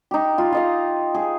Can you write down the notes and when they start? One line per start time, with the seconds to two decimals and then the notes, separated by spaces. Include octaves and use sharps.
0.11 D#4 G4
0.38 F4
0.52 F4 D#5 F5
1.14 G#4